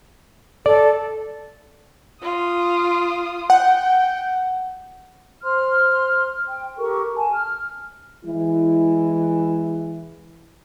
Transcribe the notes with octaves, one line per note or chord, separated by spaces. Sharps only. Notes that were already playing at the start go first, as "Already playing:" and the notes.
A4 D5
F4 D#6
F#5 G5
C5 C6 F6
G5
G4 A4 A#4 C#6
G#5 A5
F6
E3 G#3 E4